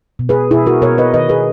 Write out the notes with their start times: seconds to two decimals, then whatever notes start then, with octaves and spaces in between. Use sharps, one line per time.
0.19 B2
0.29 G#4 B4
0.51 B2 E4 G#4
0.66 F#4 A#4
0.82 B2 A#4 C#5
0.98 B4 D#5
1.13 D#3 B4 D#5
1.29 G#4 B4